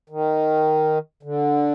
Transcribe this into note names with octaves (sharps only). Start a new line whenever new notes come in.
D#3
D3